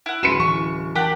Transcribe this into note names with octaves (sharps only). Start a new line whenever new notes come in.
E4 F#5
D1 C#4 F#4 B4 C6 C#7 E7
E3 C#6
E3 G4 A#4 F#5 G5 A5